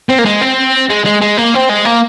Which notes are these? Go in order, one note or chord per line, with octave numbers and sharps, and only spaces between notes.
C4
A#3
G#3
C4
G#3
G#3
G#3
A#3
C4
G#3
A#3